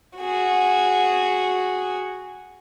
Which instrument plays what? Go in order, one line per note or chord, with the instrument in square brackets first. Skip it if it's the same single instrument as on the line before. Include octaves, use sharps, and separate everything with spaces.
[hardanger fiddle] F#4 G#4